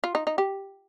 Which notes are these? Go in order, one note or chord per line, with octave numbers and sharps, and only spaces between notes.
F4
D#4
D#4
G4